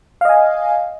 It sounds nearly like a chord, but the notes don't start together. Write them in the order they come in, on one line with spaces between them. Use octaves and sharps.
F5 D#5 G#5